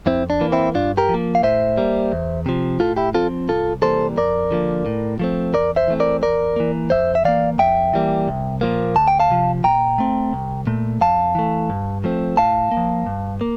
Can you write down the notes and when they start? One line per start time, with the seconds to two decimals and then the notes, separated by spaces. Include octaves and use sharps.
0.06 F2 C4 E4
0.30 D4
0.41 E3 A#3
0.52 C4 E4
0.74 G2 D4 F4
0.97 G4 A#4
1.09 F3
1.14 A#3
1.35 F5
1.43 A2 C5 E5
1.77 G3 A#3
2.12 E2
2.46 C3 F3
2.80 A2 F4 A4
2.97 E4 G4
3.14 F3 C4 F4 A4
3.48 C2 F4 A4
3.82 C3 E3 G3 A#3 A4 C5
4.17 F2 A#4 D5
4.51 D3 F3 A#3
4.86 A2
5.19 F3 A3 C4
5.53 E2 A#4 D5
5.76 C5 E5
5.88 E3 A3 C4
6.00 A#4 D5
6.22 E2 A#4 D5
6.56 E3 A#3
6.90 F2 C5 E5
7.15 E5
7.25 E3 A#3 D5 F5
7.58 F2 E5 G5
7.93 E3 G3 A#3
8.28 C2
8.61 A#2 F3 A#3
8.96 D2 A5
9.08 G5
9.19 F5 A5
9.30 C3 F3
9.64 A#2 G5 A#5
9.98 A3 C4
10.33 C2
10.67 A#2 A3
11.01 F2 F5 A5
11.35 E3 A3
11.70 G2
12.04 F3 A3 C4
12.37 A2 F5 A5
12.71 A#3
12.77 F3
13.06 G2
13.41 A#3